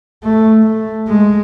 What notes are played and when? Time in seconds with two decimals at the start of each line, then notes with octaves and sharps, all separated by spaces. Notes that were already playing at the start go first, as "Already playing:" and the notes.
0.24 A3
0.62 A3
1.08 G#3